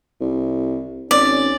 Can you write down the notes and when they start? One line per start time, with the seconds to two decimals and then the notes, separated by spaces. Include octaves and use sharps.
0.21 C2
1.11 G#1 C#4 D5